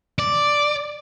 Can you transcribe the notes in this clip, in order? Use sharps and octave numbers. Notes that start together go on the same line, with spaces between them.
D5